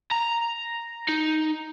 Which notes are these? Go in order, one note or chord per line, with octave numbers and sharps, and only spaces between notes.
A#5
D#4